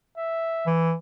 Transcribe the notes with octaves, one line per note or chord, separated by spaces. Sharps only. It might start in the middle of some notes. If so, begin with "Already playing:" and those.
E5
E3